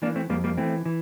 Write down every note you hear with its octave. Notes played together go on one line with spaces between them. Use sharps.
E3 A#3 D4
A3 C4
F2 G3 A#3
G3 A#3
E3 A3 C4
E3